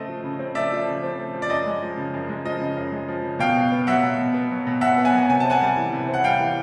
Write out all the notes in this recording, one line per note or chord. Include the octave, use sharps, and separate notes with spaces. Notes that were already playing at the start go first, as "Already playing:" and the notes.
Already playing: C#3 A3 C4 D#5
F3
C#3
C4
A3 D5 E5
F3
C#3
C4
A3
F3
D5
F#2 D#5
G#3
F3
C#3
F#2
G#3
F3 D#5
C#3
F#2
G#3
F3
C#3
B2 F5 G5
B2
B3
F#3 E5 F#5
B2
B2
B3
F#3
B2
B2 E5 F#5
B3
F#5 G#5
F#3
C3 G#5
C4 A5
F#5 G#5
G3
E3
C3
C4
F#5
G3 F5 G5
E3